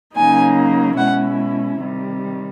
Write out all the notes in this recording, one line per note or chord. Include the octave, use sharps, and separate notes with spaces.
C#3 F#3 A#3 D#4 G#5
B2 G#3 C#4 E4 F#5
C3 D#3 G3